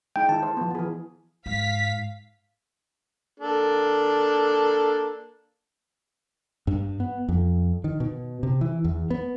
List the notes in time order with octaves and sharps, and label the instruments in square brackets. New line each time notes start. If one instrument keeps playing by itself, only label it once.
[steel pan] G#3 D#4 [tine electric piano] G5
[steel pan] D#3 E4 [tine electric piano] A5
[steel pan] C5
F3 B3
E3 G#4
[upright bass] G#2 [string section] F5 B6
[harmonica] A#3 D4 A4
[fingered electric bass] G2
B3
F2
D#3
B2
C3
E3
E2
B3